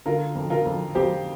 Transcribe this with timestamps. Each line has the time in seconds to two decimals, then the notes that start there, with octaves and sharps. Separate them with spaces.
0.06 D3 F4 A#4
0.35 F2
0.50 F4 A#4
0.65 F2
0.95 F2 G4 C5